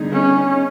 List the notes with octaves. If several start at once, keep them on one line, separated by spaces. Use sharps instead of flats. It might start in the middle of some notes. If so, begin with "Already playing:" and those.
Already playing: D3 G3 B3 D#4 G#4
C#4